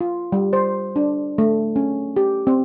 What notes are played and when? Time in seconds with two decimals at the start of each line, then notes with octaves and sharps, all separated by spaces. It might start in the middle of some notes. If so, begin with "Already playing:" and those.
0.01 F4
0.32 G3
0.53 C5
0.96 D4
1.38 A3
1.76 C#4
2.17 G4
2.47 C4